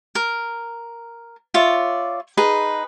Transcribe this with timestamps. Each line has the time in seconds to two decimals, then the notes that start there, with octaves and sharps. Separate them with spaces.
0.15 A#4
1.54 F4 C#5 D5 E5
2.37 D#4 G#4 B4